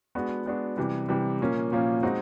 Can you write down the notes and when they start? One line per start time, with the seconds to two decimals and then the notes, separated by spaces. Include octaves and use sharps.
0.15 G#3 B3 D4 F#4
0.46 G#3 B3 D4 F#4
0.77 C3 E3 G3
1.09 C3 E3 G3
1.41 A#2 F3 A#3 C#4
1.72 A#2 F3 A#3 C#4
2.03 G#3 C4 D#4 F#4